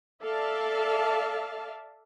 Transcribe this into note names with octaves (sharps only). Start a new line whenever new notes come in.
A4 D5 E5 F5 A5